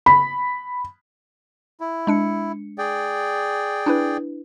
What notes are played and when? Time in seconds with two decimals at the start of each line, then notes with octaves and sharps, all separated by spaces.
0.06 B5
1.80 E4
2.07 G#3 D4 C#7
2.78 G#4 D5 G5
3.86 D4 E4 B4